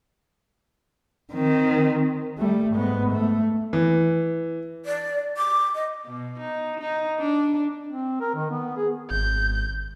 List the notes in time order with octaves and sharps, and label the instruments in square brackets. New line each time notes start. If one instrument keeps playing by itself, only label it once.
[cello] D#3 C4
[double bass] G3 A3
G#2 B3
A3
[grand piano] E3
[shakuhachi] D5
D6
D#5
[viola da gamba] B2
D#4
D#4
D4
[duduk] C4
A#4
D#3
B3
G#4
[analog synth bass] G#1 [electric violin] G6